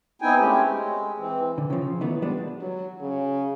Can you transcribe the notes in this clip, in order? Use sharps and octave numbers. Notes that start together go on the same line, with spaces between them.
B3 C4 D#4 E4 G5 G#5
G#3 A3 C4 C#4 G4
G#3
E3 C4
D3
C#3 F3
D#3 E3 A3 B3
G3 G#3 B3 D4
F#3
C#3